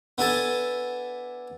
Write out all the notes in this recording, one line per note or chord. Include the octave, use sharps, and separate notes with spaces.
B3 D4 E4 A4 G#5 A5